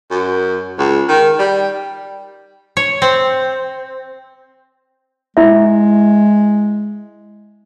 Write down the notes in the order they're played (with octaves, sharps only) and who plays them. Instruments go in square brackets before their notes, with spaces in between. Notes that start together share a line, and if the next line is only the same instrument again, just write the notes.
[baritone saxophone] F#2
C#2
D#3
G3
[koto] C#5
C4
[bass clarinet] G#3 [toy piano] E4 E5